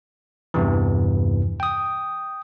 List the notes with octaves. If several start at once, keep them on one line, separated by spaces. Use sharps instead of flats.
E2 G2 C3 E3
G5 D#6